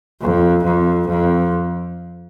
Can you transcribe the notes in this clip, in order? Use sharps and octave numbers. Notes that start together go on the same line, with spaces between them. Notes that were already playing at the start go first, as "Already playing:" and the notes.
F2
F2
F2